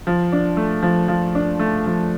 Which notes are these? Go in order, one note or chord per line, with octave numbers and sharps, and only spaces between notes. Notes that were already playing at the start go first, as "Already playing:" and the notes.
F3
D4
A3
F3
F3
D4
A3
F3